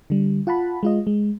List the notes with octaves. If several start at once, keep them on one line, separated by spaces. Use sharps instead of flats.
D3 G3
F4 F#5 A5 B5
G#3 F4 D#5
G#3